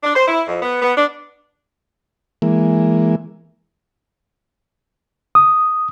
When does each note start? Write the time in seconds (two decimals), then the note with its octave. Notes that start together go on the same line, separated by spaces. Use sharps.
0.04 D4
0.15 C5
0.28 E4
0.48 F2
0.63 B3
0.81 B3
0.97 D4
2.42 E3 G#3 A#3
5.35 D#6